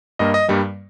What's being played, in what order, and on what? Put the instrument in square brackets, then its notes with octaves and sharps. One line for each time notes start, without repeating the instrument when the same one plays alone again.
[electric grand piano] G2 G3 A#3 D#5
D#5
G2 G3 A#3